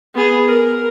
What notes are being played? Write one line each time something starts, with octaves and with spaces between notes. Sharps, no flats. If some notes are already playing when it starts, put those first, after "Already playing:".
B3 G#4
A#4